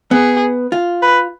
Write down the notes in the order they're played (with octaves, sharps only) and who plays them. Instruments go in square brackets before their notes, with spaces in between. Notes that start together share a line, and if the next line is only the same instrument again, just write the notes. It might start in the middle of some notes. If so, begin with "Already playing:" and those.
[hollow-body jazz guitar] B3 [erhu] G#4
[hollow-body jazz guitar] F4
[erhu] B4